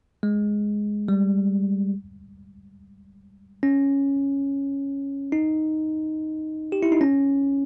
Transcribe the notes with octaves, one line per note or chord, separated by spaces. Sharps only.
G#3
G3
C#4
D#4
G4
E4
D#4
C#4